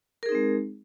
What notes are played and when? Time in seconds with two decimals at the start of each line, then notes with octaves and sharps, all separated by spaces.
0.23 A#4
0.26 G#4
0.29 D#4
0.32 C4
0.35 G#3